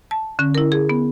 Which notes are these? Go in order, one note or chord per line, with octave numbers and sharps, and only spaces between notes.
A5
D3 C#4
E4 A#4
G#4
B3